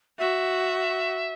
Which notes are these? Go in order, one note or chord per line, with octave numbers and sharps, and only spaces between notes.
F#4 E5